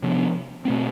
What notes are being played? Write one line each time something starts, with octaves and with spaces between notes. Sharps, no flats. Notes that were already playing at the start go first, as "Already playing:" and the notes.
C3 F3 B3 D4
B2 A3 C4